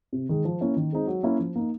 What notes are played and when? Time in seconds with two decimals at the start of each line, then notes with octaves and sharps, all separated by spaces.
0.13 C3
0.29 D#3 G#3
0.45 F3
0.61 A#3 C#4 E4
0.77 D#3
0.92 G#3 C4 D#4
1.07 F#3
1.23 A#3 C#4 E4
1.40 F3
1.55 A#3 D#4